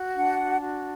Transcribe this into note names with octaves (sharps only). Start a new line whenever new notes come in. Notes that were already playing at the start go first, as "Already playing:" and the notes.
Already playing: F#4
D4 F#5
F#4